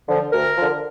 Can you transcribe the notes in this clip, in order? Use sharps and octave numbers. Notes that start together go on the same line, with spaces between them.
D3 F3
D2 A#4
D3 F3